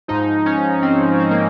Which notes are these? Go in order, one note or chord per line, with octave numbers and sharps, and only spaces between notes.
G#2 F3 D#4
C#4
C4
C4
A#3